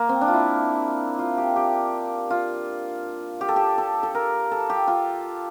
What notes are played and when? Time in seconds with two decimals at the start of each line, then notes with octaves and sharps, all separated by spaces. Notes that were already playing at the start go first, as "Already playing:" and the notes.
Already playing: A#3
0.09 C4
0.21 D4
0.28 F4
0.33 E4
1.19 F4
1.38 G4
1.56 G4
2.30 F4
3.41 G4
3.49 A4
3.56 G4
3.78 A4
4.03 A4
4.15 A#4
4.51 A4
4.70 G4
4.88 F4